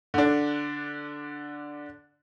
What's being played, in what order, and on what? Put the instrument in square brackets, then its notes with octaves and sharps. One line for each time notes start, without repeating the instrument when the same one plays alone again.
[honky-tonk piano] D3 D4